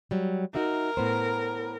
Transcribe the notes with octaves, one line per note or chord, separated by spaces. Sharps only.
F#3 G3
D#4 F#4 A#4 E5
A2 B3 C5